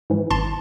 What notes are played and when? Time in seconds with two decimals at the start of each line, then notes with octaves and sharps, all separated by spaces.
0.10 G#2 E3
0.30 G#1 A5 C6